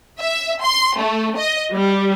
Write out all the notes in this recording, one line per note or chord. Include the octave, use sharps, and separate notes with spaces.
E5
C6
A3
D#5
G3